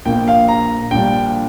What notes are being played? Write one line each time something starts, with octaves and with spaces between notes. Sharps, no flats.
A#1 A#2 A#3 G5
F5
A#5
A#1 A#2 G3 D4 G5